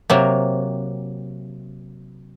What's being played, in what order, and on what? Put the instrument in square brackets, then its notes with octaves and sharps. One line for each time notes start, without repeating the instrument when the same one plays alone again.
[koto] C3 F#3 A#3